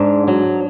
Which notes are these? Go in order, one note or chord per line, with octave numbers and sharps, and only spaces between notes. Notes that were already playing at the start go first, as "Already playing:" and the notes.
Already playing: G#2 D4
F#3